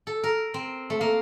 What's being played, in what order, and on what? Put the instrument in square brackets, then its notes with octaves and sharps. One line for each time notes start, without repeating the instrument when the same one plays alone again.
[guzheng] A4
A#4
C4
A3
[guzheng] A#3 [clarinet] F5